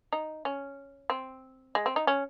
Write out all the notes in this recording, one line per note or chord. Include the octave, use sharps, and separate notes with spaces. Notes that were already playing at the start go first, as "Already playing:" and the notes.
D#4
C#4
C4
G#3
C4
D#4
C#4